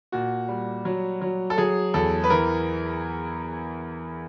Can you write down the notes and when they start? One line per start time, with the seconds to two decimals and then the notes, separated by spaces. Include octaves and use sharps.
0.12 A#2 F#4
0.48 G3
0.85 F#3
1.21 F#3
1.50 A4
1.58 F#3 G#4
1.94 E2 A4
2.24 B4
2.30 E3 A#4